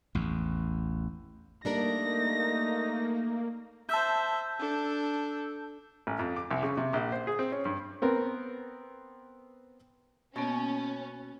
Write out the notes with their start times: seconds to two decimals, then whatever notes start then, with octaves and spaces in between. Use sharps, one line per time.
0.15 A1 E2
1.65 G3 A3 A#3 D4 D#4 A#4 A#6
3.89 C5 E5 A5 E6 G6
4.60 D4 A4
6.07 A1
6.19 F2
6.36 D6
6.51 C2
6.63 C#3
6.77 C3
6.93 A#1
7.12 C5
7.27 G#4
7.39 C4
7.52 C#4
7.65 G2
8.02 B3 C4 A#4
10.36 B2 A#3 B3 C#4